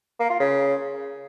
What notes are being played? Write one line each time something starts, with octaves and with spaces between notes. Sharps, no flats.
A#3
F4
C#3